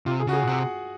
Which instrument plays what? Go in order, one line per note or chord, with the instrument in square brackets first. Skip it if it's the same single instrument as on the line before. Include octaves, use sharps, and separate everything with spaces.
[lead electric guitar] C3 [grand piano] F4
[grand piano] G#4
[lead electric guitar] C#3 [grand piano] F#4
[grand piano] G#4
[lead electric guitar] A#2
[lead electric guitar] C3 [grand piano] F#5